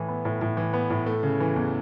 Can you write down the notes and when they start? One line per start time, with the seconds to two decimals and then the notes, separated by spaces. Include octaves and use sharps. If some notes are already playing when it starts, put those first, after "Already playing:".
Already playing: A2 E3
0.08 B3
0.25 A2
0.41 A2
0.57 E3
0.73 B3
0.90 A2
1.06 A3
1.23 C#3
1.40 E3
1.56 E2